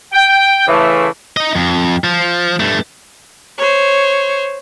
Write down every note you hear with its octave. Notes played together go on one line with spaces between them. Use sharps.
G5
C#3 E3 A3
D#4 D#5
F2
F3
G2 A3
C5 C#5